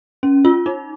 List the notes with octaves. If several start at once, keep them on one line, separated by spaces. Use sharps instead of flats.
C#4
F4
D#4